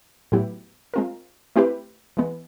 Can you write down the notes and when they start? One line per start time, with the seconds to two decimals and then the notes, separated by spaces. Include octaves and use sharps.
0.32 A2 F#3 B3 E4 G4
0.94 G#3 C4 F4 A#4
1.56 A3 C4 E4 G4 B4
2.17 E3 G#3 B3